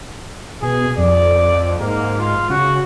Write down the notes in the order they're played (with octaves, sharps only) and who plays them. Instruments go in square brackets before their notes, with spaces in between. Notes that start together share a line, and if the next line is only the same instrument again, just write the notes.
[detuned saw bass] B2 [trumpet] G#4
[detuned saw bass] F2 [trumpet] D5
[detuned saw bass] G#2 [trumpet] A#3
[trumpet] F4
[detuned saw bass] C#3 [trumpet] F#4